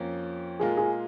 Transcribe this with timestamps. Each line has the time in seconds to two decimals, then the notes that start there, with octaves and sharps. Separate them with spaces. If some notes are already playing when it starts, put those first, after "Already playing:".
Already playing: F2 F3 A#3 C#4
0.60 A#2 G#3 F4 G#4 A#4
0.77 G#4